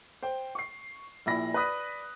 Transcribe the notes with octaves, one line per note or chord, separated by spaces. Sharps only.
C5 G5
C#6 C7
A#1 A#2 E4 B5 A#6
B4 D5 B5 D#6 F#6 B6